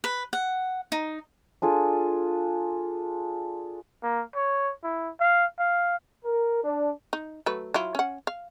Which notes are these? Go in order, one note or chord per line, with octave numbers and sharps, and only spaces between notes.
B4
F#5
D#4
D4 F4 G#4 A4
A#3
C#5
E4
F5
F5
A#4
D4
D#4
F#3 A3 B4
F#3 E4 F4
C#4 F#5
F5